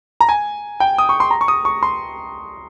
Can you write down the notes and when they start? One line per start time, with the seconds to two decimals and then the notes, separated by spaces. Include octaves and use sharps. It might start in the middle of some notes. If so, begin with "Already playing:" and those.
0.20 A#5
0.29 G#5
0.80 G5
0.98 D#6
1.09 C#6
1.20 C6
1.31 A#5
1.41 C#6
1.48 D#6
1.65 C#6
1.83 C6